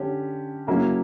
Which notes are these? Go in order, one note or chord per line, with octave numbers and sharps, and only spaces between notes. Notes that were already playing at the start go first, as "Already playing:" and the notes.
Already playing: D3 C#4 G4
C#3 F#3 A#3 C#4 E4